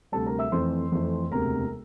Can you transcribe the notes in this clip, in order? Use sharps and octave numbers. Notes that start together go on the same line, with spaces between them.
D2 C3 G3 A4 A5
A#4 A#5
E5 E6
F2 E3 A3 C4 C5 C6
F2 E3 A3 C4
E1 D2 C3 A#4 A#5